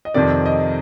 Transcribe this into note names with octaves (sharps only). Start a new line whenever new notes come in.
D#5
F2 C3 D#3 D5
D#5